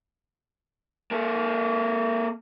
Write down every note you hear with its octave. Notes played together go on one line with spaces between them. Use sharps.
A#3 A4